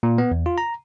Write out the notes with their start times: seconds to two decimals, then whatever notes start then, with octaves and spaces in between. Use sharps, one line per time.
0.03 A#2
0.18 B3
0.31 E2
0.46 F4
0.58 A#5